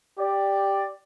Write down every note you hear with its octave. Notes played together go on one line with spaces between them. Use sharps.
G4 D5